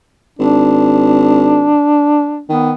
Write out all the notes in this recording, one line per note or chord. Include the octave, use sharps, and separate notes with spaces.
G#1 D4
D#3 B3